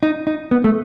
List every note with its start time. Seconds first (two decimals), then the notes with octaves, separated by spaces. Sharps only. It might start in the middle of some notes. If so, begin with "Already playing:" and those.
0.03 D#4
0.27 D#4
0.51 B3
0.64 A3